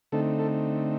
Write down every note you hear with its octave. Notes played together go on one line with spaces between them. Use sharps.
D3 A3 C4 D#4 A4
A4